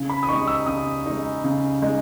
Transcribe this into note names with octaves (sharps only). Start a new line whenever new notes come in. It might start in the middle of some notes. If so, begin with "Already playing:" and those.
Already playing: C#3
B5
D#6
G#3 D#4 C#6
E6
C#3 D#6
G#3 D#4
C#3
G#3 D#4